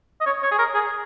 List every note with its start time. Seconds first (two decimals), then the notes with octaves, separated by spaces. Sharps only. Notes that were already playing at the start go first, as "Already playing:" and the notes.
0.21 D#5
0.26 C#5
0.43 C#5
0.51 G#4
0.59 A#4
0.74 G#4